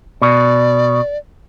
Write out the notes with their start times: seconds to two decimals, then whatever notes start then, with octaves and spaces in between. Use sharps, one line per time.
0.22 B2 D5